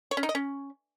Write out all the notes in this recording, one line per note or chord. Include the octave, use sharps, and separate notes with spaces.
C#5
C#4
D#4
D#5
C#4